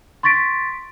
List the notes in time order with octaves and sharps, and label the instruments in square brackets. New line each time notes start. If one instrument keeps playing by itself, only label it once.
[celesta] C6 C#6 A6 B6 D7